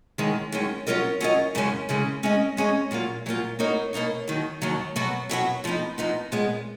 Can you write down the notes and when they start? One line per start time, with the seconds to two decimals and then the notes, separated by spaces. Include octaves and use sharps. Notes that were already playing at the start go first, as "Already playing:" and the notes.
0.18 F#2 D#3 G#3 C#4
0.52 F#2 D#3 G#3 C#4
0.87 F#3 C#4 F4 A#4 D#5
1.20 F#3 C#4 F4 A#4 D#5
1.55 F#2 C#3 G#3 C#4
1.89 F#2 C#3 G#3 C#4
2.23 G#3 C#4 G#4 D#5
2.57 G#3 C#4 G#4 D#5
2.91 A#2 F#3 A#3 F4
3.26 A#2 F#3 A#3 F4
3.59 B2 A#3 D#4 A#4 C#5
3.93 B2 A#3 D#4 A#4 C#5
4.28 D#2 D#3 F#3
4.62 D#2 D#3 F#3
4.96 B2 F#3 B3 F#4
5.29 B2 F#3 B3 F#4
5.64 F2 F3 B3 D#4
5.98 F2 F3 B3 D#4
6.32 A#2 G#3 B3